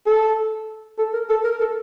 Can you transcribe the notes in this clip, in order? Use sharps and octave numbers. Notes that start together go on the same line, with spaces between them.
A4
A4
A#4
A4
A#4
A4